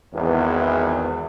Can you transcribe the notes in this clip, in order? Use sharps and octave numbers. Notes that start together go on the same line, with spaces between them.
G#1 E2